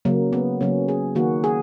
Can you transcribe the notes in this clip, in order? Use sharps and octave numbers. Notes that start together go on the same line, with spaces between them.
C#3 F#3 A#3
B3
C#3 F#3 A#3 C#4
G#4
D#3 A#3 F#4
G#4